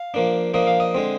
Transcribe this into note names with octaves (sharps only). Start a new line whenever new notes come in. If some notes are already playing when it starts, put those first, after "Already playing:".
Already playing: F5
F3 A#3 D4
F3 A#3 D4 D#5
F5
D#5
D3 G#3 C4